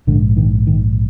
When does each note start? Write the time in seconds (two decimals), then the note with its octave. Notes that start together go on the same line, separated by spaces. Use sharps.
0.07 A#1 G#2 D3
0.37 D#3
0.67 D#3